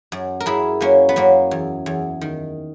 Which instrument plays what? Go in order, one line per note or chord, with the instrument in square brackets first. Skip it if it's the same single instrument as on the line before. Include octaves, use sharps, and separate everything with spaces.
[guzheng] F#2
A#4
F#2 E4 G#4
F#2 A#3 C#4
B3
F#2 A#3 C#4
E2
E2
D#3